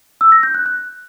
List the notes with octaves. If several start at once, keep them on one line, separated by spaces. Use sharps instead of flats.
E6
A#6
G6
F#6
F#6